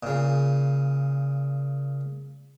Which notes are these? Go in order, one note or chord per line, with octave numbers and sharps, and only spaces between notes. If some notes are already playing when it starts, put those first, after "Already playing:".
A#2 C#3